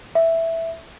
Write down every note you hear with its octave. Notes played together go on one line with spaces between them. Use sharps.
E5